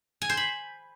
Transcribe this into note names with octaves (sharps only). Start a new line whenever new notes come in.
G#5
C5
B5